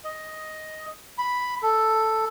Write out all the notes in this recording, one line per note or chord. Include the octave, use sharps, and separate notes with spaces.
D#5
B5
A4